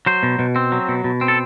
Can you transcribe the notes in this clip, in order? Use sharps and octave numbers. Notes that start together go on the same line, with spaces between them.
F#3 C5
B2
B2
C4
F#3
B2
B2
C4
A4